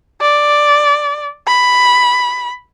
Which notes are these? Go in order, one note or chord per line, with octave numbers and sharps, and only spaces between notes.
D5
B5